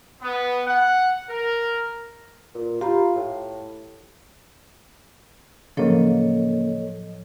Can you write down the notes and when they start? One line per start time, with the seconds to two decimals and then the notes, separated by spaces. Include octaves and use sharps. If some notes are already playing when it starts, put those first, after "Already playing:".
0.22 B3
0.66 F#5
1.31 A#4
2.55 A#2
2.81 F4 G4 A#5 B5
3.16 A2
5.77 A2 C#3 F3 F#3 A#3 A4 C#5 D#5